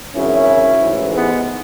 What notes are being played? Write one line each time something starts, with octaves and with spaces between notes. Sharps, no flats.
G#1 F#2 C#3 E3 C#4 E4
A1 G#2 E3
G#3 B3